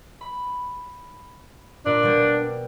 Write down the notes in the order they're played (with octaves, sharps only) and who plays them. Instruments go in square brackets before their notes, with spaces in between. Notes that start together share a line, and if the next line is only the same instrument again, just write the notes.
[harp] B5
[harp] A#2 [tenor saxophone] D4
[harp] B2 G3